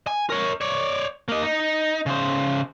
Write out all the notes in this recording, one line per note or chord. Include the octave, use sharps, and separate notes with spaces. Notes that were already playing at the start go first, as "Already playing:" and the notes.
G#5
A#4 C#5
C#5 D5
A#3 D#5
D#4
C#3 C5